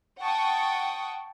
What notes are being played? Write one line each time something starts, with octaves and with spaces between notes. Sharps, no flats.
F#5 G5 A5 C#6 D#6